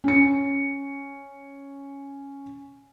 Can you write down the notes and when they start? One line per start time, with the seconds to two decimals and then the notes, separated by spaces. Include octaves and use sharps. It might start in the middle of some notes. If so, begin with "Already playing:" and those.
0.04 C#4 C#7